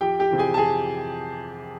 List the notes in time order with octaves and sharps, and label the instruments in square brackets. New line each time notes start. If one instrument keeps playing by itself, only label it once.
[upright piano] F2 G4 G5
G4 G5
C3 E3
G#4 G#5
A5
F2 G#4 G#5